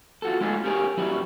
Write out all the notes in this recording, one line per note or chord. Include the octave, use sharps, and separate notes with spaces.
F4 F#4 A4
G#3 A3 C#4 D#4 F4 G#4
C#4 G4 G#4 A#4 C#5
F#3 G3 C#4 E4